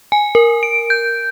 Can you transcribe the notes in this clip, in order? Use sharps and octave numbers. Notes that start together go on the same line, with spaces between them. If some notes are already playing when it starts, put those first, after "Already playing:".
G#5
A#4
D7
G6